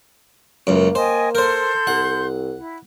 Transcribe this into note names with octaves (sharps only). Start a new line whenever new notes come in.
C#2 F#2 A#3
C5 D#5 G5 G#5
A4 A#4 C5 C6 G6
C2 F#5
E4